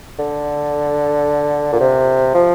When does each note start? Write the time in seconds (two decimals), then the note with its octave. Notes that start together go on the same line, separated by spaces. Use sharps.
0.19 D3
1.73 A#2
1.80 C3
2.34 F3